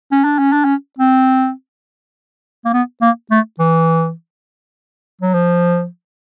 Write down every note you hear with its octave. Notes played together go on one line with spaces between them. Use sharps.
C#4
D4
C#4
D4
C#4
C4
A#3
B3
A#3
A3
E3
F#3
F3